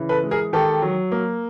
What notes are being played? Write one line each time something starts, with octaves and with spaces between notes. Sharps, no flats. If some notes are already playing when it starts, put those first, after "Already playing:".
Already playing: C#3 E3
A4 B4
G#3
G#4 A#4
D#3 G4 A4
F#3
A#3